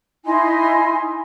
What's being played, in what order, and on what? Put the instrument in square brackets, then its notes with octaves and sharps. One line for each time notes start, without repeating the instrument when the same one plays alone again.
[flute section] D#4 E4 G#5 C6